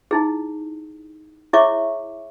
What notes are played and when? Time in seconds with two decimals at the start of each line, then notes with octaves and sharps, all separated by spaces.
0.11 D#4 E4 G#4
1.53 E4 G#4 C#5 E5 C#6 D6